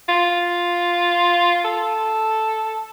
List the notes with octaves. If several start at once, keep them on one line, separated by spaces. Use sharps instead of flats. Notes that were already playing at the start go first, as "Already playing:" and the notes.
F4
A4